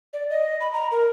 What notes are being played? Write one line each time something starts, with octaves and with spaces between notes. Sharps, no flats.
D5
D#5
B5
A#5
A#4